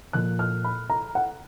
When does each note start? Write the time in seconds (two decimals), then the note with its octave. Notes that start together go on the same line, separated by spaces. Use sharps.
0.13 A#2 F3 A#3 F#6
0.39 F6
0.64 B5
0.90 A#5
1.15 F#5